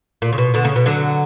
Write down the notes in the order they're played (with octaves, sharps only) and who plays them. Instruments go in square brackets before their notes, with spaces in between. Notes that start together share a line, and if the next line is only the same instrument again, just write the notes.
[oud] A#2
C#3
B2
B2 D3
C#3
B2
D3 F#3